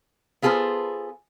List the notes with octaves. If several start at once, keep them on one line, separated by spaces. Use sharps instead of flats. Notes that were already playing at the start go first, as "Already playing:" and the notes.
B3 F4 G#4 A4 B4 C5